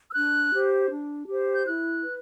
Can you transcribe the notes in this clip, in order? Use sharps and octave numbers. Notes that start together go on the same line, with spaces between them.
E6
D4 F#6
G4 C5
D4
G4 C5
G6
E4 F#6
B4